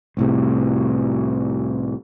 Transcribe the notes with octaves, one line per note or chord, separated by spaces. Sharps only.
C2 A2 C3